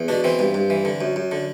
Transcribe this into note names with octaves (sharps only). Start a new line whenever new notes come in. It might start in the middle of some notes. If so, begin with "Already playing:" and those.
Already playing: E2
B2 D4
E3 C4
G2
G2
E3
D3
F#2
F#2
D3